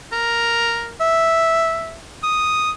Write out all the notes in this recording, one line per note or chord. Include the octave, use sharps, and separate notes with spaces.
A#4
E5
D#6